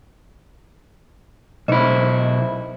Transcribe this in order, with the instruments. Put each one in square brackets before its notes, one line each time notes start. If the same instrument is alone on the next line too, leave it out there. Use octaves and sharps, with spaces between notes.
[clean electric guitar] B1 E4 [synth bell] C5 D#5